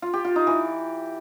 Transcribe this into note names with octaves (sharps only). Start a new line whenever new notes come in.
F4
G4
F4
D#4
E3